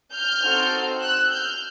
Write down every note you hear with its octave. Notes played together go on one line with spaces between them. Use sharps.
F6 G6
C4 D#4 F#4 A4
E6 F#6
F6 G6